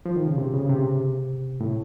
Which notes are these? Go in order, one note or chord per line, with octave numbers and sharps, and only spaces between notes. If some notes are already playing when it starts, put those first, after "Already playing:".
F3
D#3
C#3
C3
C#3
C3
A2